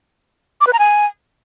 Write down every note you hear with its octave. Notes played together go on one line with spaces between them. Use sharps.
D6
B4
A#5
G#5